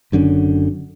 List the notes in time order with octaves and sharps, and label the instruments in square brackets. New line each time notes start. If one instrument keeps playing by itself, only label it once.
[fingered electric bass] F#1 F#2 D3 C#4